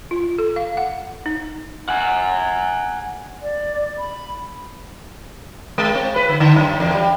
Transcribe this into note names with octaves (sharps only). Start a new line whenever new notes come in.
F4
A4
F5
F#5
D#4
F#5 G#5
D5
B5
G#3
C4
B4
D3
D3
F#2
E2
G3